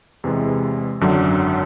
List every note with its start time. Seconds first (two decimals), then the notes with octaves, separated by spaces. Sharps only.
0.24 E2 C3 E3 G#3
1.01 G#1 F#2 D3 F#3